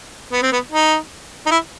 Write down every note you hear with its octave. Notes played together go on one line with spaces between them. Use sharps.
B3
C4
B3
D#4
D#4
E4